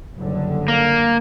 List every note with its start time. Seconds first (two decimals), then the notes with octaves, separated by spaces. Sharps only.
0.16 F#1 G2 D3
0.68 A#3